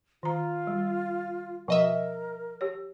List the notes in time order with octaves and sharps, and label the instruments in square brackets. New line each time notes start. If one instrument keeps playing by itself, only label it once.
[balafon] D#3 A#5 [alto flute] F4
[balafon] G3
[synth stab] B2 D#5 E5 [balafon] F3 [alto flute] A#4
[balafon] G4 C#5